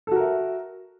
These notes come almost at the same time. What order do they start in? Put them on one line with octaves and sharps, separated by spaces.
A4 F#4 A#4 E5